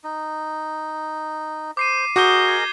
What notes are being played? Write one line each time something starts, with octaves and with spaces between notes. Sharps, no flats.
D#4
C5 D6 C7 D#7
F#4 G#4 A#4 D#5 D6 G6 G7
G#6